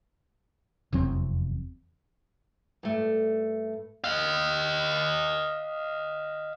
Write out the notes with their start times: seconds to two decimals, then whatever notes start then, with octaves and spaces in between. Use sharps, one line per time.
0.93 F1 E2 F#3 C4
2.83 G2 A3
4.04 D#5 F5